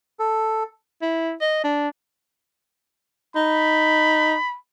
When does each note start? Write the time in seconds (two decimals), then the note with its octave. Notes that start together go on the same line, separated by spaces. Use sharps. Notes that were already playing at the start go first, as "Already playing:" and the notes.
0.19 A4
1.02 E4
1.41 D#5
1.64 D4
3.36 D#4 B5